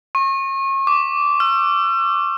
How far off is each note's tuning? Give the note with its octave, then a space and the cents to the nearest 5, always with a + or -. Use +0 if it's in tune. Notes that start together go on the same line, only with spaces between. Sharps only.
C#6 -35
D6 -15
E6 +45